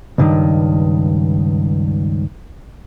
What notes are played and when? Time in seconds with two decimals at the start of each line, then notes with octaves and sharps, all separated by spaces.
0.18 C#2 G2 D#3